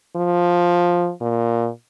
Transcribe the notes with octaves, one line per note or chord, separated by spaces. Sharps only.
F3
A#2